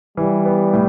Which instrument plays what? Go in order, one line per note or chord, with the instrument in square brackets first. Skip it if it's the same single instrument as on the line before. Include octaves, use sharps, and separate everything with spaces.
[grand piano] E3 [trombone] G3
[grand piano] B3
A2